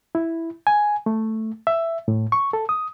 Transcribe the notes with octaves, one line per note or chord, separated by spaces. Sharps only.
E4
G#5
A3
E5
A2
C#6
A4
D#6